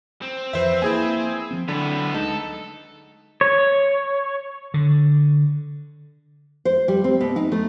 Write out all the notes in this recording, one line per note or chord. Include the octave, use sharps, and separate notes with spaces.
C4
F2 E3 F3 B4 C5 E5
A#3 E4 G#4 G#5
F3 C4
A2 D3 F#3 B3
D2 G#3 D#4 A4
C#5
D3
C5
G3
C4
B2
D#4
A3